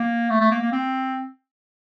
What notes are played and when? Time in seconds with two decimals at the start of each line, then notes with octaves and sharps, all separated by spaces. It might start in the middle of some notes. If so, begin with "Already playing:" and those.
Already playing: A#3
0.30 A3
0.41 A3
0.51 A#3
0.62 A#3
0.72 C4